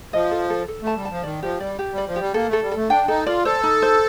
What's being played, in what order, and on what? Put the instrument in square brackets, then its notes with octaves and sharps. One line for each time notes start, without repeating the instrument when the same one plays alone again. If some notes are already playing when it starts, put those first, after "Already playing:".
[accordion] F3 [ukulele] D#5
[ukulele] A4
A4
A4
[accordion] A3 [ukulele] A5
[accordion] G3
[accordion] F3 [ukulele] A5
[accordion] D#3 [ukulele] D5
[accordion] F3 [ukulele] G4
[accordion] G3 [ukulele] D5
[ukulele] G4
[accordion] G3
[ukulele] D5
[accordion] F3
[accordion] G3 [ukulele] G4
[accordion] A#3 [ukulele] A4
[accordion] A3
[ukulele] A4
[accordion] G3
[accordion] A3 [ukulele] A4
[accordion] D4 [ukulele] G5
[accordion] D#4 [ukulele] A4
[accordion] F4 [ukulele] D5
[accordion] A4 [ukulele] C5
[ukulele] D#4
C5